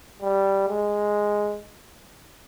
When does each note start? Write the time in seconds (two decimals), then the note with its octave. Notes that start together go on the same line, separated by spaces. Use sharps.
0.22 G3
0.69 G#3